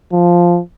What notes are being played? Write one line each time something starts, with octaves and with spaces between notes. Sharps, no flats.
F3